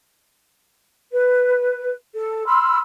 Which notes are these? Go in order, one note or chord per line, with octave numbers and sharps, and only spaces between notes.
B4
A4
B5 C6 E6 F6